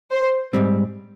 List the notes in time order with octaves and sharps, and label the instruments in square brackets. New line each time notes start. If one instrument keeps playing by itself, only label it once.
[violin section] C5
[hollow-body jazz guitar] G#2 G3 C4